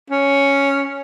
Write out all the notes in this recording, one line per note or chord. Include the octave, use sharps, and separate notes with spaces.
C#4